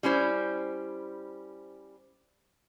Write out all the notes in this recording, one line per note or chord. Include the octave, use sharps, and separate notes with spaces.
G3 C#4 E4 C5